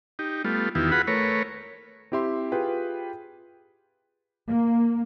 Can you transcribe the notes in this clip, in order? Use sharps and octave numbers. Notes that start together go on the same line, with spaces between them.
D#4 G4
G3 A3 B3 F4
E2 D#3 B3 E4 F4 G4
F4 F#4 G#4 B4 F#5 B5
A3 A#4 B4 C#5
C4 E4 G4 E5 C6
F4 G4 G#4 B4 G5
A#3